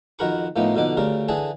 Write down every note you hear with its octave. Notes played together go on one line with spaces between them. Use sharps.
F2 D#3 F#4 A#4 B5 C#6
A2 F3 A#3 B3 D#4
F2 B2 D3 D#4 D5
D2 C#3 G3 A#4
D3 E3 G#4 E5 A5